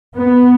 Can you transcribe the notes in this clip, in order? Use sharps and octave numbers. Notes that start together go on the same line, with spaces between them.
B3